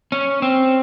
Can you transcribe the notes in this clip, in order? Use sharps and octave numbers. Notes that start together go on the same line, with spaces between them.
C#4
C4